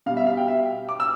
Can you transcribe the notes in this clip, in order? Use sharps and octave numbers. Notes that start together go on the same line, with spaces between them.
B2 G3 F5
E5
F5
G5
E5
D6
E6